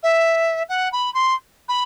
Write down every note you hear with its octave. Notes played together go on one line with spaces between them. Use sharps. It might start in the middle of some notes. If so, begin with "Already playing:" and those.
E5
F#5
B5
C6
B5